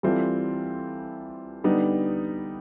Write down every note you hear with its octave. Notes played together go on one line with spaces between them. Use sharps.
E3 G3 C4 F4 A4
D3 G3 B3 D#4